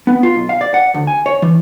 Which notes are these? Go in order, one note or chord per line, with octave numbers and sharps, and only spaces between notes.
B3
F4
B1
F5
D5
F#5
D2
G#5
C#5
E3